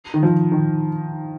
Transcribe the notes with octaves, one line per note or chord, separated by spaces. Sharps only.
D#3
F3
D#3